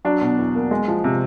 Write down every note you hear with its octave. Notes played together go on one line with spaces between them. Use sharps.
F#3 D4
B2
E2
A#3
G#3
F3
C3